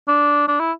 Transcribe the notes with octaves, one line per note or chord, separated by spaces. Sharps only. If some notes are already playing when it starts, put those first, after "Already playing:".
D4
D4
E4